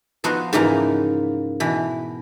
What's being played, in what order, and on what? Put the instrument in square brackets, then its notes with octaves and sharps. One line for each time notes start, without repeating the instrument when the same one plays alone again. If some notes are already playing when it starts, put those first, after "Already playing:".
[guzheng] F3 B3 D#4 F#4 C6
G#2 C#3 E3 F3 A#3 D#4
B2 E3